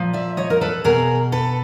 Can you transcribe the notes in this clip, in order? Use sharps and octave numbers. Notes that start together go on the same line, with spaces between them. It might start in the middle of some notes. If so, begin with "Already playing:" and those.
Already playing: A#2 F3
D5 E5
C#5 D#5
A#4
A4 B4
B2 G#4 A#4
A4 B4